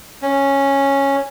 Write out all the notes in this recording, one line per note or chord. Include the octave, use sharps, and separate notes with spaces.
C#4